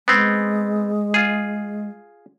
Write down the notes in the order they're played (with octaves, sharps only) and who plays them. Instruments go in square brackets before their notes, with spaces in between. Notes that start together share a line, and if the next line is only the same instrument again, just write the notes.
[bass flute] G#3 [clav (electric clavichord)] B3 C4
[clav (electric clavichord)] F4 G#4